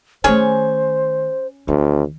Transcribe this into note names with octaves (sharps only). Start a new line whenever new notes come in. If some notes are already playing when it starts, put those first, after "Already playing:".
D#3 A3 C#4 G#4 C5 C#5
D2 D#3